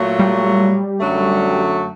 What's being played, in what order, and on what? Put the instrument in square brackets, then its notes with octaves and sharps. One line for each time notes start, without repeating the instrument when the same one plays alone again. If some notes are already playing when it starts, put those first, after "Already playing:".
Already playing: [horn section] A#2 F#3 A3
[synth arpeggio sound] G3
[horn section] F#2 D3 F#3 A3